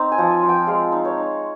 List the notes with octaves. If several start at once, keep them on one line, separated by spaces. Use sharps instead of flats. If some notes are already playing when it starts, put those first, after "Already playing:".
Already playing: C4 D#4
G#5
F3
G#5
F3
G5
G#3 F5
D#4
C#5
D#4